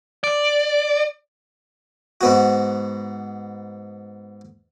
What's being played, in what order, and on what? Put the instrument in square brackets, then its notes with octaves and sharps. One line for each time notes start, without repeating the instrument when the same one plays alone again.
[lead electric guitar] D5
[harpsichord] G#2 B3 F#4